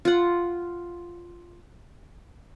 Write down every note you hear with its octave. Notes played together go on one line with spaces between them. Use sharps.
F4 F#5